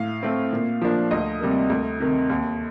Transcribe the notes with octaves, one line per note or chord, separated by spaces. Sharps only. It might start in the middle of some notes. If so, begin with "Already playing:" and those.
Already playing: A2 F5
A3 C4
A#2
F3 A#3 D4
D2 D#5
C3 G3 A#3
D2
C3 D#3
D#2